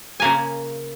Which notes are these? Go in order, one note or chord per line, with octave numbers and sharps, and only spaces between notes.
C#3 A#3 G#5